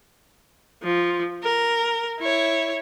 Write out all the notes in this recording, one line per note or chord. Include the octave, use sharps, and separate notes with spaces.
F3
A#4
E4 C#5